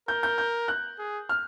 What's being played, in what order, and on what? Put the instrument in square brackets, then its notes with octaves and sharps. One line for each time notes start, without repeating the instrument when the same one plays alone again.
[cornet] A#4 [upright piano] G6
[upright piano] G6
G6
F#6
[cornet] G#4
[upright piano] F6